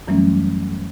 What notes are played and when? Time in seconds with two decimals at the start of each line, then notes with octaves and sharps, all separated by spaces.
0.08 F#2 E3 F#3 G3 A3 C#4